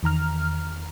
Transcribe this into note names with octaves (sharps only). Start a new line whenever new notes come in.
E2 D#3 A#5 F6